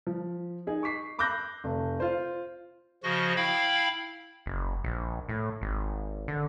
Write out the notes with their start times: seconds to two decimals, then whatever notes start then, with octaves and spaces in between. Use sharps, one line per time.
0.07 F3
0.67 D#4 G#4
0.83 C#6 D6 B6 C7
1.19 B5 D6 E6 F#6 G6 A#6
1.64 F1
2.00 F4 C5
3.03 C#3 F3 F#4 D#5 A#6
3.36 E4 F5 G5 B5
4.46 F#1
4.84 A#1
5.29 A2
5.62 G#1
6.28 D3